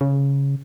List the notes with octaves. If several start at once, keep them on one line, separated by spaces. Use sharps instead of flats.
C#3